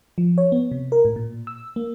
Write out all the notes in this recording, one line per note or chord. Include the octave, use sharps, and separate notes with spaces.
F3
C#5
B3
C3
A#4
A2
A#2
E6
A#3